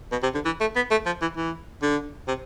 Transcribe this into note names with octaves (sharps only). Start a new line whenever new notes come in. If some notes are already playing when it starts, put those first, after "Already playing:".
B2
C3
D3
E3
A3
B3
A3
F3
E3
E3
D3
C3